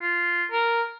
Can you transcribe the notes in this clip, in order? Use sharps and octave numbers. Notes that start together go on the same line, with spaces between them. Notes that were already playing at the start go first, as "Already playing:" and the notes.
F4
A#4